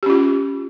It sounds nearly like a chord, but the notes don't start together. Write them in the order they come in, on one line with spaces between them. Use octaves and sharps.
G4 C#4 F4